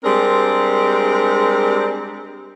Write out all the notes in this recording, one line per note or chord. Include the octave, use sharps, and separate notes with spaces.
G3 G#3 C4 D4 A#4